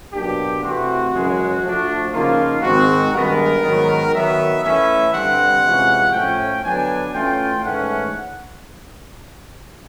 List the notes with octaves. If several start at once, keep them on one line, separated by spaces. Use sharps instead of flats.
B2 F#3 A#3 D4 G4
C3 E3 A3 C4 F#4
F#2 C#3 E3 G#3
F3 A3 D4
C#3 F3 A#3 D#4 F4
G#2 D#3 G#3 C4 F#4
G2 D#3 G#3 B3 A#4
G#2 D#3 F#3 B3
D#3 F#3 B3 E5
E3 A3 C#4 E5
G2 D3 G3 C4 F#5
C3 E3 G#3 C#4 F4
A2 F3 A3 C#4 F4 G5
D3 F#3 B3 D4 G#5
E3 A3 C#4 F4 G5
G#2 E3 A3 C#4 F#5